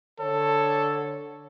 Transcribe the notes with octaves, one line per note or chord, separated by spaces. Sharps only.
D3 A4 C#5